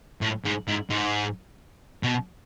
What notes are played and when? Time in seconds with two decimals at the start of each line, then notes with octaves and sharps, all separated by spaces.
0.21 A2
0.45 G#2
0.68 G#2
0.90 G#2
2.03 B2